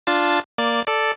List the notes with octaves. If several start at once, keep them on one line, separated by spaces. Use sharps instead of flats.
D4 F4 A5
A#3 D5 D6
A4 D5